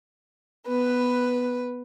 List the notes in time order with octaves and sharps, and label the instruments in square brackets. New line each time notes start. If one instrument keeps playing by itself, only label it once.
[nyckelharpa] B3 [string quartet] B4